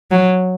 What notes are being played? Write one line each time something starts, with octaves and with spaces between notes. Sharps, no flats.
F#3